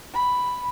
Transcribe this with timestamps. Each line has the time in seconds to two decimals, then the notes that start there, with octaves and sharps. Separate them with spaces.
0.14 B5